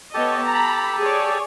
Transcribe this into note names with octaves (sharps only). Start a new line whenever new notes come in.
B3 G4 A4 C#5 D#5 A5
A#5 B5
G#4 C#5 D5